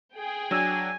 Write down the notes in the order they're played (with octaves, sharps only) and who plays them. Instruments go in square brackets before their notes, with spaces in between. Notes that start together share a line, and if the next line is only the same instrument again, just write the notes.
[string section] G#4 G5
[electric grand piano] F#3 D4 E6 [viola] G#5